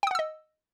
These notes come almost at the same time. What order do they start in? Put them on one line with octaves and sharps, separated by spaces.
G5 D#6 F#5 E6 D#5